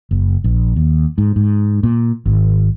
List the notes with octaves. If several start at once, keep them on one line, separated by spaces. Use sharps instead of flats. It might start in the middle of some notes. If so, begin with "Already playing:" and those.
F#1
A#1
D#2
G#2
G#2
A#2
G#1